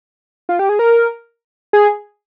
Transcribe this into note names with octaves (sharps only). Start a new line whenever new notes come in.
F4
G4
G#4
A#4
G#4